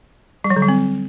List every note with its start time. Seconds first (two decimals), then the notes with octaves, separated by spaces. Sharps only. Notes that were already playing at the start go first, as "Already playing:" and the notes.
0.44 G3
0.50 F#3
0.56 D3
0.62 G3
0.68 C4